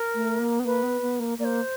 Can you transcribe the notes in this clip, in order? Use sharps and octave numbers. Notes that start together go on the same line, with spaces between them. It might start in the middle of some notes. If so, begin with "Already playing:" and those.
Already playing: A#4
A3
A#3
B3
A#3 B4
B3
B3
A#3
A#3 D5
C5